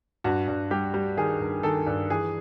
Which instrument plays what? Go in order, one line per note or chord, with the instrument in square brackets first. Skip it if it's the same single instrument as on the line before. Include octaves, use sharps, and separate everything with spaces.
[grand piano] G2 F#4
G2
G3 G4
G3
D#3 G#4
G2
D#3 A4
G2
E3 G#4